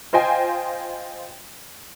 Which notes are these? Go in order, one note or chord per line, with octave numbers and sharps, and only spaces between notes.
F4 C5 D#5 G5 G#5